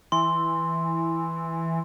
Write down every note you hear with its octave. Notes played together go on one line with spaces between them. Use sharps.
E3 C6